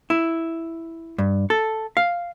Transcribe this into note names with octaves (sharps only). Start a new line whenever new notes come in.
E4
G2
A4
F5